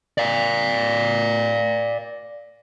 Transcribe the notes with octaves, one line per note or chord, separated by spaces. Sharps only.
D5 F5